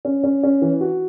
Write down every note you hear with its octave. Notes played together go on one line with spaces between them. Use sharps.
C#4
C#4
C#4
E3
F#4